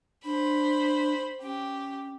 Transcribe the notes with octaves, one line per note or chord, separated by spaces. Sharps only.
D4 C5 B5
C#4 G4